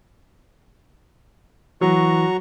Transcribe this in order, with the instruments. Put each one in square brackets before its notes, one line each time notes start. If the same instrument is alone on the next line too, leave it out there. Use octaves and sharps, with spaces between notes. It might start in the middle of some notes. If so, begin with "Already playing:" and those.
[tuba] E3 [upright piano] F#3 [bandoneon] F#4 A#5 C#6